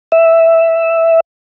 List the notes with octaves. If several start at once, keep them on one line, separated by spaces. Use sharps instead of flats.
E5